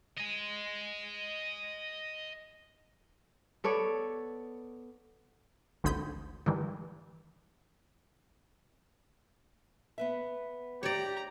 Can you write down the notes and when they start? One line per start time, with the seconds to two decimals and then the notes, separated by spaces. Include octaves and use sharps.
0.18 D#5 G#5
3.64 B3 A4 C#5 D5
5.84 G#1 D2 C4 B5 D#6 G6
6.46 G2 D#3 E3 G3
9.98 B3 B4 E5
10.83 G4 C#5 D5 A#5